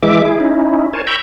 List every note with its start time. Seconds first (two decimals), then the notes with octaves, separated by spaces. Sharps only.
0.03 E3 G#3 E5 D6
0.25 E4 G#4
0.40 C#4 D#4 E4
0.93 A#4 C5 C#5 G#5 A5
1.07 G5 A#5 B5 C#6 E6 G6